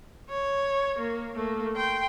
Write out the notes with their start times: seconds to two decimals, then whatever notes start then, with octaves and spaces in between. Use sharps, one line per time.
0.30 C#5
0.99 A#3
1.35 A3 A#3
1.76 G5 C6